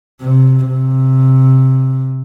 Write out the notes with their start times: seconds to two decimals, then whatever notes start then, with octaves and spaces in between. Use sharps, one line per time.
0.21 C3
0.68 C3